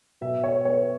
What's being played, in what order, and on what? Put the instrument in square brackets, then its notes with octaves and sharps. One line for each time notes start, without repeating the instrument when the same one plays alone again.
[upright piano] B2 E5
C#5
B3 C#5